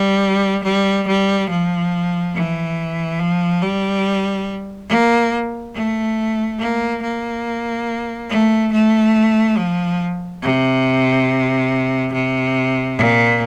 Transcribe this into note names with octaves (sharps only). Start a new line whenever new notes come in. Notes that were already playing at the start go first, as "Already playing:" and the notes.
Already playing: G3
G3
G3
F3
E3
F3
G3
A#3
A3
A#3
A#3
A3
A3
F3
C3
C3
A#2